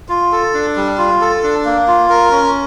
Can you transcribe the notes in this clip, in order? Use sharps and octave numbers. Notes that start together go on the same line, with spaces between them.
F4
A4
D4
G3
F4
A4
D4
A#3
F4
A#4
C#4